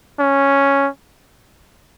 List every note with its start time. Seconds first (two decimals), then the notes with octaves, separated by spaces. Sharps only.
0.20 C#4